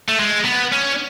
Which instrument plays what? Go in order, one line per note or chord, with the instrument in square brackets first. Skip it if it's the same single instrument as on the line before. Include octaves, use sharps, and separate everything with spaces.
[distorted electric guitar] A3
G#3
B3
C#4